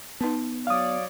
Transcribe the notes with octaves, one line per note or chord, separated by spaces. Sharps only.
B3 D#4 B4 A5
F#3 C#5 D5 F5 D#6